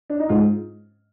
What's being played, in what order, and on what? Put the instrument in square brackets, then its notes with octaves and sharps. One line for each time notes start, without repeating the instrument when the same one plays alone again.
[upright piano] D4
D#4
[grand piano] G#2 [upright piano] F4